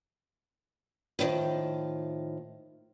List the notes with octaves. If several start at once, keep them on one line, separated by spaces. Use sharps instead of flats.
A2 D3 D#3 F3